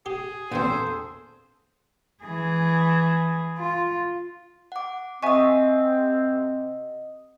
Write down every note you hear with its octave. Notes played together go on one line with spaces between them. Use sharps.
G4 G#4
A#1 E2 A#2 C4 A4 C5
E3 G#4
F4
F#5 D6
C3 C4 D#5 E5 F#5 G#5 C#6 D#6